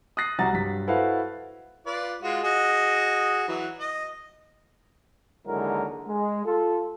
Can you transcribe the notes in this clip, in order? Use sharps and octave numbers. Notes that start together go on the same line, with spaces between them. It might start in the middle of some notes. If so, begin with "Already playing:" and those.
D#6 F#6 A#6 C7
C2 F#4 A#5 A6
G2 F#3 B6
E4 F#4 A4 B4 C5 F5
F4 B4 D5
G#3 F4 F#4
F#4 G#4 D#5
E3 F#3
D#5
D#2 D3 F#3 G#3 E4 A#4
G#3
F4 A4